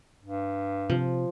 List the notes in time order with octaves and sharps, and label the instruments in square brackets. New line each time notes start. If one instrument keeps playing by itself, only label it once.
[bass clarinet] G2
[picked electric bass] C3 [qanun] F3